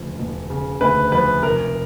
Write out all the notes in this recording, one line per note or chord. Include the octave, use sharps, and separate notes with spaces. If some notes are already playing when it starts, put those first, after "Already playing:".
Already playing: E1 D2 C#3 F3
E1
C#3
D2 B4
F3 B4
F1 A#4